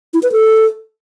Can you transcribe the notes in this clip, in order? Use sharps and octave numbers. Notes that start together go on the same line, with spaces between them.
E4
B4
A4